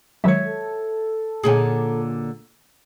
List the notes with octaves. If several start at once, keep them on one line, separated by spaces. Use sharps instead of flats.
D#3 F#3 G#3 C#5 E5
A4
A#2 D3 D#4 G#4 C#5 G#5